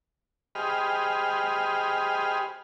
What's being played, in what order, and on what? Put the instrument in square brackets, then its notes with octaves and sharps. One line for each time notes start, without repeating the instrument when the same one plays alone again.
[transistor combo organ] G4 G#4 C5 D#5 B5 F6